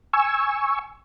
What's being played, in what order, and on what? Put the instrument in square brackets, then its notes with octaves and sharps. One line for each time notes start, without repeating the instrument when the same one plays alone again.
[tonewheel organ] G#5 C#6 E6